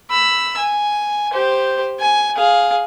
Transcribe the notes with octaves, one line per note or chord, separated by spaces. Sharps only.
B5 E6
G#5
G4 C5
G#5
G#4 F5